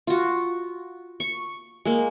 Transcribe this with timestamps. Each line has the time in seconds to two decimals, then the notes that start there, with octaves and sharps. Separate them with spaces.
0.07 F4 F#4
1.20 C#6
1.85 G#3 A#3